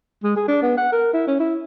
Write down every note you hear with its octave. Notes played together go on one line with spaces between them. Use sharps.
G#3
G#4
D4
B3
F#5
A#4
E4
C#4
E4